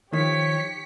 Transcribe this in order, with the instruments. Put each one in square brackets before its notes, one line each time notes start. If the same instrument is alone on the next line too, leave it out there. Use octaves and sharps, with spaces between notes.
[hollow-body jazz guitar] D#3 F3 [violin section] G4 B6 C#7 [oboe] C#5